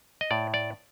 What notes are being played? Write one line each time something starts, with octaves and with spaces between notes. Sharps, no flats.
D#5
A2 D5
D5